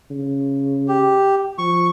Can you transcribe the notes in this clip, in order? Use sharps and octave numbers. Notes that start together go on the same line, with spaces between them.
C#3
G4
F3 C#6